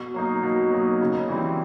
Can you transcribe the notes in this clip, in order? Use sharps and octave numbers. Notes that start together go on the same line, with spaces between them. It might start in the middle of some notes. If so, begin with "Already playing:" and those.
Already playing: B2
F#3 A#3 D#4
B2
F#3 A#3 D#4
C#3
E3 G3 C4 E4